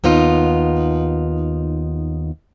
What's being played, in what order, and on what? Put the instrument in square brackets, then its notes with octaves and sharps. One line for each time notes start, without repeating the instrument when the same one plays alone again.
[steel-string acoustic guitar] D#2 B3 D#4 F4